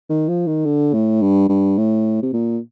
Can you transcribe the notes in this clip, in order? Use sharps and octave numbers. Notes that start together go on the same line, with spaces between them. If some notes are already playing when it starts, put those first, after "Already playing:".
D#3
F3
D#3
D3
A2
G2
G2
A2
C3
A#2